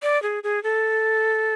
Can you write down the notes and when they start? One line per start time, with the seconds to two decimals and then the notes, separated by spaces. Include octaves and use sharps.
0.03 D5
0.23 G#4
0.43 G#4
0.63 A4